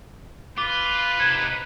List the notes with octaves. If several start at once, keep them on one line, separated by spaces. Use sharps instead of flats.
F4 B4 D6
C3 D#4 G#6 D#7